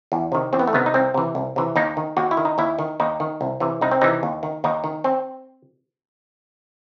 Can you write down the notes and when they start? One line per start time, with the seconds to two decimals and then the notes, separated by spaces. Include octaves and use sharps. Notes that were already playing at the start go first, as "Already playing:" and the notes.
0.12 E2
0.32 C3 D#3
0.53 E2 C4
0.59 B3
0.67 A3
0.73 C3 D#3 B3
0.86 D#4
0.94 C2 C4
1.14 C3 E3
1.35 C2
1.56 C3 E3
1.76 D#2 D#4
1.97 D#3
2.17 D#2 F#4
2.31 E4
2.37 D#3
2.45 D#4
2.58 D#2 E4
2.79 D#3
3.00 D#2 D#4
3.20 D#3
3.41 C2
3.60 C3 E3
3.81 C2 D#4
3.91 C4
4.01 C3 E3 D#4
4.23 D#2
4.43 D#3
4.64 D#2 D#4
4.84 D#3
5.04 C4